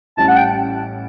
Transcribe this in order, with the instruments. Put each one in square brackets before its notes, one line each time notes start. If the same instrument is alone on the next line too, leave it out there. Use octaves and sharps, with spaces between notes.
[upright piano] A1 A2 G3 C#4 E4 [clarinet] A5
[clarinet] F#5
G5